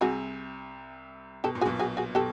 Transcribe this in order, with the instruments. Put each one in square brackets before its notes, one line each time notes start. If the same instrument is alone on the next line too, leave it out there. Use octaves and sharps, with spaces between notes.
[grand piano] C2 C3 [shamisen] F#4 G#4
[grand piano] B2 [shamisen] G4 A4
[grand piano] A#2
[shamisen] F#4 G#4
[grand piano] B1 B2
[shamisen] F#4 G#4
F#4 G#4
[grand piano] B2 [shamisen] G4 A4